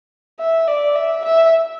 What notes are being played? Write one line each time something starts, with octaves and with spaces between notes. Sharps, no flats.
E5
D5
E5
E5